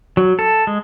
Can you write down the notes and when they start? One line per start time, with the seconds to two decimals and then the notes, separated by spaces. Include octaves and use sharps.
0.17 F#3
0.39 A4
0.67 G#3